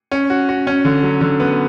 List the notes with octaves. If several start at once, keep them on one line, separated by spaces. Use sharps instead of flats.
C#4
F#4
F#4
C#4
D3
F#3
D3
B3